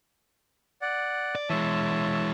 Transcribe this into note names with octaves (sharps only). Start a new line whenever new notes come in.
D5 F#5
D5
E3 G#3 C#5 E5 A5